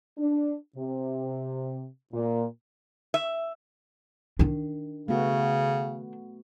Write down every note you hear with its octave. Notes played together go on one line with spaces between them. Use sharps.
D4
C3
A#2
E5
D#3 D4
C#3 A3 B3 F#4